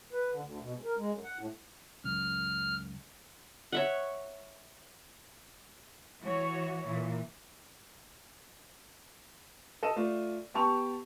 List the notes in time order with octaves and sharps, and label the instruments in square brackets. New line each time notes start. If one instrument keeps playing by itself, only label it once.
[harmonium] B4
D3
D2
B2
G#2
A#4
G#3
F#2
F#5
A2
[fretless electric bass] C#2 F#2 [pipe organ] F6
[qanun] C#5 E5 F#5
[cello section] E3 F#4 C#5
A#2 E3
[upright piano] A4 D#5 D#7 E7
A3 F4 D5
B3 G4 A5 C#6 F7